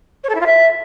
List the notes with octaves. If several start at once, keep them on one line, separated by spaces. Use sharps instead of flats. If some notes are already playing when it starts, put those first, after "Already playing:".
C#5
A4
E4
F4
E5